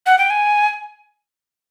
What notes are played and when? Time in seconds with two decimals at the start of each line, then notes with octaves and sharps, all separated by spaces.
0.06 F#5
0.18 G5
0.30 G#5